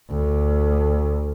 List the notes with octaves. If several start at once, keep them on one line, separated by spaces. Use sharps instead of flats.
D2